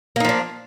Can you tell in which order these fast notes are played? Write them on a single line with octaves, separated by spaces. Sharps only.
A#3 D#4 F3 D4